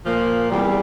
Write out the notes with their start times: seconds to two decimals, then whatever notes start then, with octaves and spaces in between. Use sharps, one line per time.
0.04 A#2 F3 A#3
0.49 E2 C3 G3